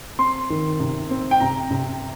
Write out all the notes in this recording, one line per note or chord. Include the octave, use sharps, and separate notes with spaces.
C4 C6
D#3
C3
C4
G5
C3 A#5
C3